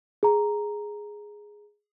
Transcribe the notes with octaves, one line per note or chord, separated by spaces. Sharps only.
G#4 A#5